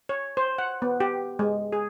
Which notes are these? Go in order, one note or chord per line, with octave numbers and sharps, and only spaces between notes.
C#5
C5
F#5
B3
G4
G#3
G#4